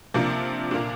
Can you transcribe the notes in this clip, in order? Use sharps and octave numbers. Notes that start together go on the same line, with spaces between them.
C3 F3 A#3 D4
A#2 A#3 D4